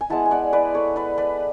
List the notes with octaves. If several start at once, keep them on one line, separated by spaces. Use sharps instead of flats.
G#5
G#3 B3 E4 F#5 A5
G#5
D5 F#5
B4 D5
A4 C#5
B4 D5
B4 D5